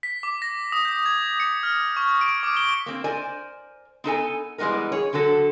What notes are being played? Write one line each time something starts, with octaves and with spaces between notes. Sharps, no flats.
B6
D6
A#6
D#6
G6
G#6
C#7
F6
C#6
D7
D6
G7
A#3 C4
A#4 C5 D5 G#5
B3 D#4 A4 G#5
E3 G3 G#3 B3 D#4 A#4
G#4 C#5
D3 F#3 F#4 A4